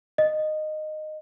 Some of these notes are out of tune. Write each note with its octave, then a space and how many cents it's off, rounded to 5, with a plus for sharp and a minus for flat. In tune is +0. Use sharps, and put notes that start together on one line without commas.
D#5 -15